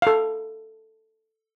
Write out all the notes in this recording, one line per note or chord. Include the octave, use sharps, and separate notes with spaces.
A4 F5